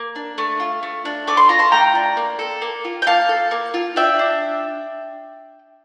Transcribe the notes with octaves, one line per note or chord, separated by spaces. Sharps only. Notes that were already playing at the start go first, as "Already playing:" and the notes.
Already playing: A#3
D4
A3
F4
A3
D4
A3 D6
C6
F4 A#5
A5 C6
A3 G5 A#5
D4
A#3
A4
A#3
F4
G5
A#3 F5 A5
A4
A#3
F4
D4 E5 G5
D4